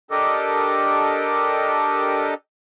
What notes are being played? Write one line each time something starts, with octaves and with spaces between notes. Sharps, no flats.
D4 G4 A4 A#4 D#5 D6